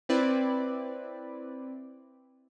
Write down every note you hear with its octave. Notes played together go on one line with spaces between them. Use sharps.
C4 E4 B4 D5